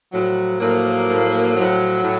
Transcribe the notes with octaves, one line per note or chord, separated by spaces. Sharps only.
A2 F3 F#3
A2 F3 F#3 A#3
A2 F3
A2 F3 F#3
A2